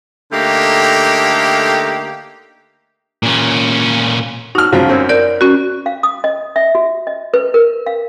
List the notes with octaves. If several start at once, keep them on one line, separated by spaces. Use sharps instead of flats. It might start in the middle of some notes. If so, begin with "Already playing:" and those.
D3 A3 A#3 D#4 G4
A#2 C#4
D#4 F#4 F6
C#3 F3 F#3
F#2 C4 C#4
A#4 D5 G6
C#4 F#4
F5
D#6
D#5
E5
F#4
D#5
B4
A#4
F5